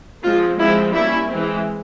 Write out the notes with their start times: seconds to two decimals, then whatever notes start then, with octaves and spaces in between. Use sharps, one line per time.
0.24 F3 G#3 C4 F4
0.58 F3 G#3 C4 E4
0.93 G3 A#3 C#4 E4
1.28 E3 G#3 C4